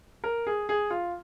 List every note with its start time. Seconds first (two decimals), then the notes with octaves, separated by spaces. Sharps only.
0.24 A#4
0.47 G#4
0.69 G#4
0.91 F4